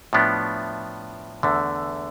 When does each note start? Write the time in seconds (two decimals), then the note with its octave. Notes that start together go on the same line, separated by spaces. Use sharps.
0.13 A2 F3 B3 D4
1.43 E2 D3 A3